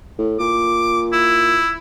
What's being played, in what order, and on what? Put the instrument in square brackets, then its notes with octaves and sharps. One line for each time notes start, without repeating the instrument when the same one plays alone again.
[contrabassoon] A2
[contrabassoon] A#2 [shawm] D6
[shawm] E4